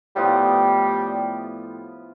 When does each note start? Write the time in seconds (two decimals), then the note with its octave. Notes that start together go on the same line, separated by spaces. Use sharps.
0.16 A2 F3 G3 B3 F4